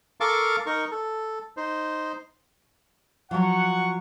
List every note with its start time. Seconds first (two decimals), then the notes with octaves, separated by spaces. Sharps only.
0.20 A4 A#4 F5 A5 C#6 D6
0.66 D#4 A#4 C#6
0.91 A4
1.57 D#4 C5
3.31 F3 F#3 F#5 C#6